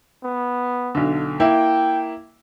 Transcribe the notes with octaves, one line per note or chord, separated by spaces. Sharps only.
B3
B1 D3
A#3 E4 G5